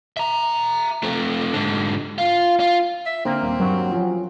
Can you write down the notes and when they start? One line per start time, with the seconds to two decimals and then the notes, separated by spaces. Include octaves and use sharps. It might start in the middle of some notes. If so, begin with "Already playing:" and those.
0.17 E5 A#5
1.03 A3 C4
1.53 G#2 D3
2.18 F4
2.60 F4
3.06 E5
3.25 D3 A#3 C4
3.42 D#1
3.60 G2 F#3 A#3
3.91 F3 C#4